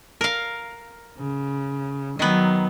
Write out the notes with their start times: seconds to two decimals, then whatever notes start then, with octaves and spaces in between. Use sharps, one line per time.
0.21 A#4 F5
1.18 C#3
2.19 D#3 F#3 B3